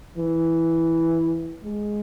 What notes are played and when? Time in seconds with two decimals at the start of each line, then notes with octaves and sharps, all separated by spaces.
0.17 E3
1.64 G#3